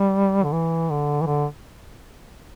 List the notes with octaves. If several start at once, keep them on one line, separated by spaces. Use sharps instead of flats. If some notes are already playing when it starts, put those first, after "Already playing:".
Already playing: G3
D3
E3
D3
E3
D3